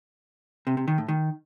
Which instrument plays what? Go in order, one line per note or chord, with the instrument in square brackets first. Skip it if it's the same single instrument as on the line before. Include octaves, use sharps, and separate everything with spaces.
[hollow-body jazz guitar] C3
C3
D#3
A2
D#3